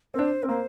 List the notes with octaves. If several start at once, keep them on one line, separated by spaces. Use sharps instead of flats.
C4 A#4
D4 C5
C4 A#4
A#3 C5